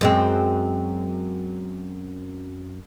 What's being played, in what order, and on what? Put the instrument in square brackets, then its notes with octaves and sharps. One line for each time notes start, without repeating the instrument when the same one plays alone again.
[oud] F#2 G#3 C4